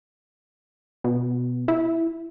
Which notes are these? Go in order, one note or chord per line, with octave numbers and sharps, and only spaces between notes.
B2
E4